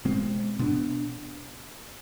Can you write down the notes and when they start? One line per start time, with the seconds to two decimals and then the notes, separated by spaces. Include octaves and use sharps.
0.05 B2 G#3 C4
0.59 B2 B3 D4